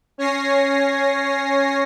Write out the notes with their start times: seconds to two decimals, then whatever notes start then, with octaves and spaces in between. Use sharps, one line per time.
0.18 C#4 C#5 G#5 A#6 C7